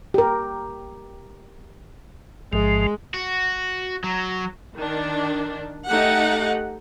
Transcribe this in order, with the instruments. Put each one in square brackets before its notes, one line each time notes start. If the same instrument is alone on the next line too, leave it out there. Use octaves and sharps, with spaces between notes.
[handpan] G4 A#4
[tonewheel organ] A1 G#2 F3 [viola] G#3
[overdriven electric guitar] F#4
F#3
[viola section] D#3 D4
A3 D#4 G4 F#5